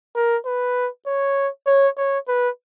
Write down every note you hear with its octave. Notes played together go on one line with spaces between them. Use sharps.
A#4
B4
C#5
C#5
C#5
B4